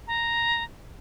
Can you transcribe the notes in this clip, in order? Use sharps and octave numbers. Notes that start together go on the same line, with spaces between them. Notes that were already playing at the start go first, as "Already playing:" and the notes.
A#5